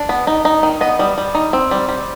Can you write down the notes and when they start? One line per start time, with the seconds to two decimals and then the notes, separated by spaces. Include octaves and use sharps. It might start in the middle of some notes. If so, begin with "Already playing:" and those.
Already playing: D4
0.09 B3
0.27 D#4
0.45 D#4
0.63 D#3
0.81 B3 D#5
0.99 G3
1.18 G3
1.35 D#4
1.53 C4
1.71 G3
1.89 G3